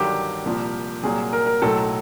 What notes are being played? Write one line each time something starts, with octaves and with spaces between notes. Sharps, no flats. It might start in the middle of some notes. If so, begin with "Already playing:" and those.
Already playing: G1 G2 D#3 F#3 G4
C2 A#2 F3
C2 A#2 F#3 G#4
A#4
A#4
B1 A2 F#3 A4